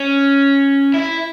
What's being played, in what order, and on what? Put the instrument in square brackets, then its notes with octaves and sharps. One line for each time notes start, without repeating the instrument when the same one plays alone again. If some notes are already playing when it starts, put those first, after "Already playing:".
Already playing: [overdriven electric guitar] C#4
E4